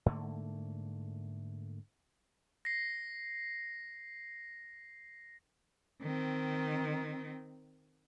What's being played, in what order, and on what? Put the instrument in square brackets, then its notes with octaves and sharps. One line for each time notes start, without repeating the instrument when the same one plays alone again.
[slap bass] G#2 D3 A3 A#3
[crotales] A#6 C7
[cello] D#3 C4